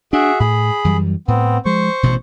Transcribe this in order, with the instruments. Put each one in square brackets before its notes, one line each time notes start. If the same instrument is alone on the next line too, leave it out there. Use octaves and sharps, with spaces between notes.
[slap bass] D4 [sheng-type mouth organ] F#4 G#4 E5
[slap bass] A2 [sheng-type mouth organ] G#4 B5
[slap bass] F#2 E3 G3
[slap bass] A2 [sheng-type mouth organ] B3 C4
[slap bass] F3 G#3 [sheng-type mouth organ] C5 C#6
[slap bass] A1 B2